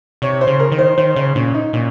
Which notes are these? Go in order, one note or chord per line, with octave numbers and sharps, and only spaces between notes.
C3 C#5
C5
C#3
A#4
D#3
C5
D#3 C5
C#3 C5
A#2 C#4
D#4
A#2 C#4